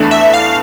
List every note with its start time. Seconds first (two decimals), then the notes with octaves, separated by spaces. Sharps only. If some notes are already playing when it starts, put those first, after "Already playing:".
Already playing: E2 E3 A3 D4
0.11 E5
0.34 F5